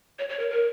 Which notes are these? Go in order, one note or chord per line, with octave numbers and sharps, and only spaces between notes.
C#5
C#5
A#4
A#4